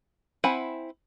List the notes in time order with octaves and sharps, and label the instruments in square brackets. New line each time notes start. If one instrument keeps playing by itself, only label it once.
[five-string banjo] C4 E4 F#5 G#5 B5